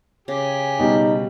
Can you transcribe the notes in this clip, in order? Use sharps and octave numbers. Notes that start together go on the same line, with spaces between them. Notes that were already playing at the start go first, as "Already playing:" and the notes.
C#3 G4 G#4
B2 G3 D#4